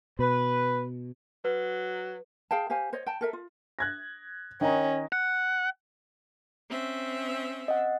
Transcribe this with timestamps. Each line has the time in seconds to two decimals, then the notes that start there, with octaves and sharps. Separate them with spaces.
0.19 B2 B4
1.45 F#3 B4
2.51 G#4 F5 G5 A5
2.70 G4 C5 F5 G#5
2.93 C5 C#5 D#5
3.07 G5 A5
3.21 A4 A#4 E5
3.33 F4
3.79 F#6 G#6 A#6
4.61 D#3 C#4 D#5 A#5
5.12 F#5
6.70 C4 C#4 E5
7.68 D#5 F#5